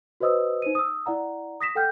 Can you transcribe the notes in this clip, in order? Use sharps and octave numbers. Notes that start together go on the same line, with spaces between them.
F#4 B4 C5 D#5 D#6 E6
D#4 C5 D#7
D#6 E6
E4 D5 F#5 A#5
D#6 A#6 B6 E7
A4 F#5 G5 F6 G6